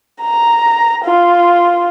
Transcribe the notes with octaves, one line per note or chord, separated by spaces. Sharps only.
A#5
F4